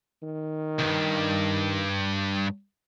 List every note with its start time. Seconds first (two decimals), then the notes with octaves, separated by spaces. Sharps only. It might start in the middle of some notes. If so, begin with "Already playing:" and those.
0.23 D#3
0.79 D2 G2